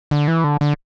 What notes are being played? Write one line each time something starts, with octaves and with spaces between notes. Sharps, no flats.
D3
E3
D3
D3